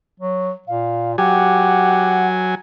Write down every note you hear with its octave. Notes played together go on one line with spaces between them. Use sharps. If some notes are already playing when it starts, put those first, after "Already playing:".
F#3
A#2 F5
F#3 G4 F#5 G#5